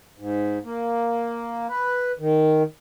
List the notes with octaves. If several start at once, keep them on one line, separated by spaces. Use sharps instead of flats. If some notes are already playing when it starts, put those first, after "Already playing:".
G#2
A#3
B4
D#3